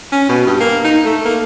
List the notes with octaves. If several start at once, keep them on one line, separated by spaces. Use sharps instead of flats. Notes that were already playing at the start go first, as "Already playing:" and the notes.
C#4
B2
G2
A#3
D#4
A3
A#3